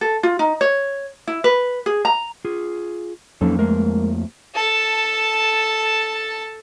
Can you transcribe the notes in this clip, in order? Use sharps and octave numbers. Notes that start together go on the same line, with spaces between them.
A4
F4
D#4
C#5
E4
B4
G#4
A#5
F4 G#4
F2 F3 F#3 A#3 C#4 D#4 A4
G#3 A3 A#4
A4 A5